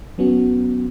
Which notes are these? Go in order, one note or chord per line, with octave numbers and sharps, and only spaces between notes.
F#3 B3 C#4 F#4